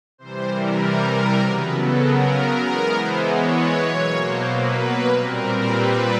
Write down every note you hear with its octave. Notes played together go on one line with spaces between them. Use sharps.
C3 E3 G3 C5
A#4
A#4
C#3 F#3 B3 B4
A4
A#4
E3 G#3 B3 A#4
C5
C#5
B2 F#3 A#3 C#5
C5
B4
A#2 G3 C4 A#4
B4